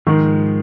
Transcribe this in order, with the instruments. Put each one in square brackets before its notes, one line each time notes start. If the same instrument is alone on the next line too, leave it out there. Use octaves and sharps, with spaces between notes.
[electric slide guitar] G#2 F3 G#3 [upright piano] D#3